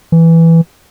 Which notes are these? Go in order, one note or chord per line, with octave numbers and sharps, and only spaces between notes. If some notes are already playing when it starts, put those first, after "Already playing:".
E3